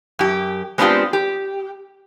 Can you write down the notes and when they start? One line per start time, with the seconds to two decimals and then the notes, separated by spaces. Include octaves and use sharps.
0.19 F#2 G4
0.78 G#3 B3 C4 D4 F4 G4
1.13 G4